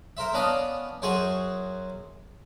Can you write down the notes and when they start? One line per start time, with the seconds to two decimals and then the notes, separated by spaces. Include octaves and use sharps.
0.17 A#4 C5 E5
0.34 B3 C#4 D4 D#5 F5 D#6
1.02 F#2 F#3 G#4 C5 G#5 C#6